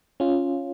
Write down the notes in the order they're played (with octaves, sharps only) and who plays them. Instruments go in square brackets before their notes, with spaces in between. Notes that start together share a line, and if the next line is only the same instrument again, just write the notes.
[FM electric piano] C#4 F4